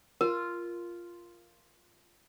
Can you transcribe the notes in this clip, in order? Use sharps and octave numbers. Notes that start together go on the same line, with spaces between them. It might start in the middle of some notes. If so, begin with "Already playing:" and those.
F4 A#4